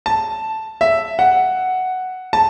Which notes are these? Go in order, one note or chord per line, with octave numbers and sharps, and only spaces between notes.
A5
E5
F#5
A5